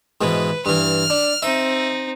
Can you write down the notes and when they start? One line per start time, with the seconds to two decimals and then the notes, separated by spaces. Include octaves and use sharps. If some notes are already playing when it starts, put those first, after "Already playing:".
0.21 G#2 B2 E3 B4
0.66 G2 E3 F6
1.10 D4
1.42 C4 D#4 E5